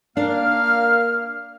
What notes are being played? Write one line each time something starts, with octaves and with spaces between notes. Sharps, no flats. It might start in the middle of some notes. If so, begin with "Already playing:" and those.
A#3 D4 F5 F6